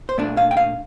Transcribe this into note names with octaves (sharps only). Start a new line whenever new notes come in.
C5
A#2 A3 D4 D5
F5
G5
F5